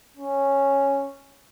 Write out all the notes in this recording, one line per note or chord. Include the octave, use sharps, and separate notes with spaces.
C#4